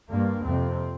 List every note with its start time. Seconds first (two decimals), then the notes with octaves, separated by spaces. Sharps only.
0.10 G2 A#3
0.45 F2 C3 C4